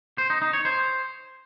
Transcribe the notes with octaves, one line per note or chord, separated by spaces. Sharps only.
C5
D#4
D#4
C#5
C5